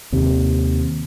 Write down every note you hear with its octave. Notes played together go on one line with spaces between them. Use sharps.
D#2 C3